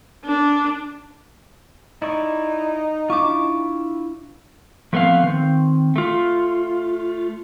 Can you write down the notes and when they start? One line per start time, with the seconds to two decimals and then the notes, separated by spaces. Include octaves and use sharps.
0.25 D4
2.02 D#4 E4 D5 C#6
3.10 D4 E4 F4 C#6 D6
4.93 F3 A3 B3 C4 F5
5.23 D#3 C4
5.96 A3 F4